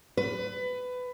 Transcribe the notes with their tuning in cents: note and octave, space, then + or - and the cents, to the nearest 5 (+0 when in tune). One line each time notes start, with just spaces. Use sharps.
B4 +20